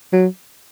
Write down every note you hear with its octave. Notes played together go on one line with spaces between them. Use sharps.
F#3